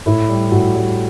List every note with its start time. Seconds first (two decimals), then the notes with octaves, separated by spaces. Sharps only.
0.06 A2 E4
0.29 G3
0.52 A2 F#4
0.75 G3